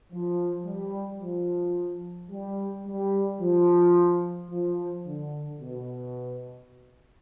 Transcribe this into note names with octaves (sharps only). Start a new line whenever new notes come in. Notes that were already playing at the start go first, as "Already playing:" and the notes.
F3
G3
F3
G3
G3
F3
F3
D3
B2